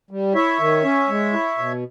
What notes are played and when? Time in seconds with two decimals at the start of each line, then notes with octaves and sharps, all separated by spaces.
0.11 G3
0.35 E4 C#5 E5
0.60 D#3
0.84 C#4
1.09 G#3
1.33 E4
1.58 B2